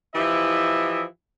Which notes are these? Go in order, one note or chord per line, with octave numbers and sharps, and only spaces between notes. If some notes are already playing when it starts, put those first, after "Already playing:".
E3 F3 E4 G4 D#5 E5